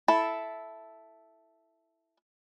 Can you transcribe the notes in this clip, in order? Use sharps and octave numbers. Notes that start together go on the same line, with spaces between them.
E4 A4